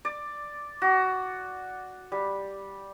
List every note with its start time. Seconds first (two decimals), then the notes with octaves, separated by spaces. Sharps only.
0.05 D5
0.82 F#4
2.12 G3